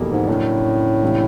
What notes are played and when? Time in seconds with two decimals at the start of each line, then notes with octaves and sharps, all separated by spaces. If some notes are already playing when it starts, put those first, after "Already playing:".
Already playing: F1 E2 B2 G3 A#3
0.09 G#2
0.28 F#2 A2 C#3 F#3 A#3 D4
1.02 C#2 C3 E3 A3 D4